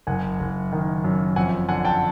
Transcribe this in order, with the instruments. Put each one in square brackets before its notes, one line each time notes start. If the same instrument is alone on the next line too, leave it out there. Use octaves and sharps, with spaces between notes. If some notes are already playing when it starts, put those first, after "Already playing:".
[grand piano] F#1 F#5 G#5
F#1
D#3
F#2
F2 F#5 G#5
D3 F#5 G#5
G5 A5